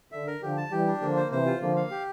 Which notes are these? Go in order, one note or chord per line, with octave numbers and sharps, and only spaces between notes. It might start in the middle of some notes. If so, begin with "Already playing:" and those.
D3 E5
A#4
D3 F3 G4
A5
E3 G3 G4
D4
D3 F3 A#3
C5
C3 E3 C5
F4
D3 F3 A#3
F5
G4